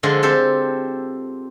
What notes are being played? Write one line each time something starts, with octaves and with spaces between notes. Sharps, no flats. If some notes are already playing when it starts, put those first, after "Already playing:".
D3 F3 G#3 F4 A4
C4 G4 A4 C5